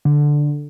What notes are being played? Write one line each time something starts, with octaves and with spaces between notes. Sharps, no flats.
D3